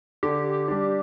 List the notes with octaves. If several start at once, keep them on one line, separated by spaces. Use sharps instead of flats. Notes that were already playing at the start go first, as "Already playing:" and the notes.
D3 G4
G3 D4